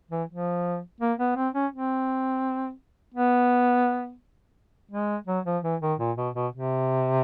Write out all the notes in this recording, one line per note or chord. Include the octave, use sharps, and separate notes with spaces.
E3
F3
A#3
B3
C4
C#4
C4
B3
G#3
F#3
F3
E3
D#3
A#2
B2
B2
C3